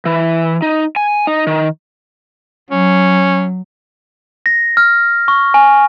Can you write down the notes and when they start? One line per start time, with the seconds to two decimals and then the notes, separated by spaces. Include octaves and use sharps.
0.05 E3
0.62 D#4
0.96 G#5
1.27 D#4
1.47 D#3
2.71 F#3 C#4
4.46 A#6
4.77 F6
5.28 C#6
5.54 G#5